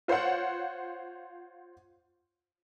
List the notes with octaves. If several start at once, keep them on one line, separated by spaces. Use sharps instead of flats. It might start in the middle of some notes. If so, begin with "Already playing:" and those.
F4 C5 C#5 F5 F#5